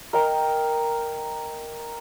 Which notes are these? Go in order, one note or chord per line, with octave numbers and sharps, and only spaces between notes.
A#4 D#5 G5 A#5